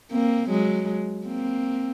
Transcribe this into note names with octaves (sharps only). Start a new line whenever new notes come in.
A#3 C4
F#3 G#3
A#3 C4